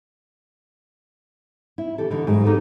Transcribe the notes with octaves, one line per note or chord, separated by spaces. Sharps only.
E4
E3 G4 A4
D3 E3 D#4
G#2 F#3 G#3
A#3 D#4 G4 A4 B4